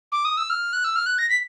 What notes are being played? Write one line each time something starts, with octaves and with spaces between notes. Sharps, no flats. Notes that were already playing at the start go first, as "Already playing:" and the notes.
D6
D#6
E6
F6
F#6
E6
F6
F#6
A#6
B6